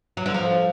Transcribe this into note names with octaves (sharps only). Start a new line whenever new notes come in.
F#3
D3
F3